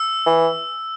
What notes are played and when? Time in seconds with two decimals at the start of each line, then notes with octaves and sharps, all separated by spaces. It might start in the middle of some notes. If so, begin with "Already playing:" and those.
Already playing: E6
0.26 E3